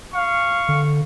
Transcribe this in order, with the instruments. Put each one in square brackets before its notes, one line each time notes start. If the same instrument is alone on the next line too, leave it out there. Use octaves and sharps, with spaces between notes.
[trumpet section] F5 C#6
[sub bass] D3